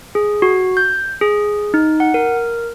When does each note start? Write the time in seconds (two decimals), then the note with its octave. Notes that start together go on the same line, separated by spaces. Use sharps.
0.15 G#4
0.42 F#4
0.77 G6
1.21 G#4
1.74 D#4
2.00 F#5
2.14 A#4